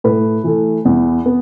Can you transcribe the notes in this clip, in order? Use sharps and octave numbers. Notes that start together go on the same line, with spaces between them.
A2 B4
E3 A3
E2
B3